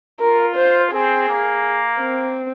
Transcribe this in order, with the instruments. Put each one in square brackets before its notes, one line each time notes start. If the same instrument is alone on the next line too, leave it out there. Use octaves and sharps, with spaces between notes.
[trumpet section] F4 [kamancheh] A#4
[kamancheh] C5
[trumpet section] C4 [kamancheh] G#4
[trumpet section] A#3
[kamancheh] C4